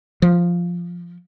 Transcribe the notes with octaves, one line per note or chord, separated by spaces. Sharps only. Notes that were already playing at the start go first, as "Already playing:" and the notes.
F3